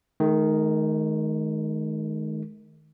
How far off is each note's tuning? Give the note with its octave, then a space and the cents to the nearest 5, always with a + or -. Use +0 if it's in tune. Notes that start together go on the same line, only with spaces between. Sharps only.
D#3 +0 G#3 +45